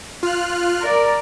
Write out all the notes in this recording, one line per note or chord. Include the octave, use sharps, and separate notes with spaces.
F4 F6 F#6
A#4 D5